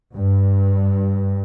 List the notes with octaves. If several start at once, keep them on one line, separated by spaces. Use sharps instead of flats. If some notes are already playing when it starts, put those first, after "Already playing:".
G2